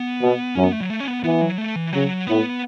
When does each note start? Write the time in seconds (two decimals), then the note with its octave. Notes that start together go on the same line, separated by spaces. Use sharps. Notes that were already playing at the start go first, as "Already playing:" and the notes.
Already playing: B3
0.21 B2
0.55 F#2 C#4
0.64 B3
0.72 A3
0.81 F#3
0.90 A3
1.00 C#4
1.07 B3
1.24 E3 B3
1.41 F#3
1.58 A3
1.76 E3
1.93 C#3 F#3
2.27 A2 B3